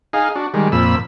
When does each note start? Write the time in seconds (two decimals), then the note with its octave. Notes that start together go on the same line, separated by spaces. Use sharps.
0.13 D#4 G#4 F5
0.35 D4 F#4
0.54 D#3 G3 G#3
0.72 F2 A#2 B5 E6